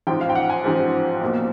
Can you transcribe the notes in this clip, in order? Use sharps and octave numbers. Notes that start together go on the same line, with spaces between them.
A1 G#2 F3 G5
F5
G5
F#5
G#5
A1 G#2 F3
B1 A#2 F3